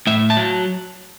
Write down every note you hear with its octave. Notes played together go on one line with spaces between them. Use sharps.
A2 E5
A5
F#3